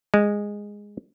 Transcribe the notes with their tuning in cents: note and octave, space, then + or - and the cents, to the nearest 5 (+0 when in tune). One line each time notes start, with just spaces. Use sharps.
G#3 -10